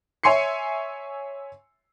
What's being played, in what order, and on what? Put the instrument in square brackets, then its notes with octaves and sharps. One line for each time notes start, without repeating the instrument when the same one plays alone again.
[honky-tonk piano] C#5 E5 G#5 C6 C7 C#7